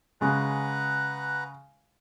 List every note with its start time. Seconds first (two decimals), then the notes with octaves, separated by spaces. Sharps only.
0.21 C#3 G#3 B4 F#5 A#5